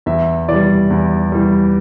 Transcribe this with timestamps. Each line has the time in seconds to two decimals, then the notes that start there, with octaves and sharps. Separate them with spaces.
0.06 E2 E5
0.49 E3 G3 D5
0.90 E2
1.32 E3 G3